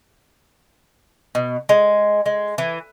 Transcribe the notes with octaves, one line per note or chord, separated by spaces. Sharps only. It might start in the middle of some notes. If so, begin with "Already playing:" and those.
B2
G#3
G#3
E3